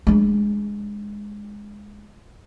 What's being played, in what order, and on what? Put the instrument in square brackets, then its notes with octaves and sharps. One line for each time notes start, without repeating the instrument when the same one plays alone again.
[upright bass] G#3 D4